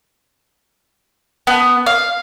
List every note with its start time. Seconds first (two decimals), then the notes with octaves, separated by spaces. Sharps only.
1.47 B3
1.86 F5